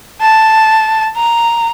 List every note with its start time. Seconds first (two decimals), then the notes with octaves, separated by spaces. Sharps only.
0.21 A5
1.16 A#5